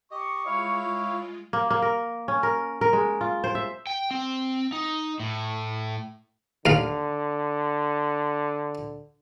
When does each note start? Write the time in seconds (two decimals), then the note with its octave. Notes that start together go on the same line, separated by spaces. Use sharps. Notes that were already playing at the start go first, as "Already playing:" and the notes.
0.11 G4 D#5 C#6
0.46 G#3 E4 F4 C#5 F5
1.53 A#3
1.70 A#3
1.82 A#4
2.28 C#4
2.43 A#4
2.81 A#4
2.93 G#3
3.21 F4
3.44 C5
3.55 E5
3.87 G5
4.11 C4
4.72 D#4
5.20 A2
6.66 D#2 D3 F5